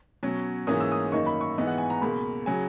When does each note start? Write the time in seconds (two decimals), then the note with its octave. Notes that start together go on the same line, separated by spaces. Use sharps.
0.23 B2 F#3 C#4
0.67 G#2 E3 A#3 C#4 D#6
0.80 E6
0.92 D#6
1.12 F#2 D#3 A#3 D#4 C#6
1.26 B5
1.41 C#6
1.58 G#2 E3 B3 D#4
1.67 F#5
1.78 G#5
1.90 A#5
2.01 C#2 B2 A#3 B5
2.46 C#3 F#3 G#5